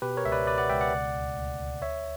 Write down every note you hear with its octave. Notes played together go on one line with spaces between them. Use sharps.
B2 G4 B4
A#4 C#5
C#2 E5
B4 D5
B2 B4 D5
D5 F#5
C#2 E5 G5
D5 F#5
C#3
D2
D2
D2
D2 C#5 E5